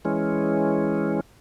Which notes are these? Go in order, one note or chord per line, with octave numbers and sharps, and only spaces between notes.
E3 G#3 C#4